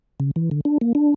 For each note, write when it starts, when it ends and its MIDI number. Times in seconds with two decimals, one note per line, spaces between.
0.20 0.31 49
0.36 0.50 52
0.51 0.61 50
0.65 0.78 62
0.81 0.93 58
0.95 1.14 62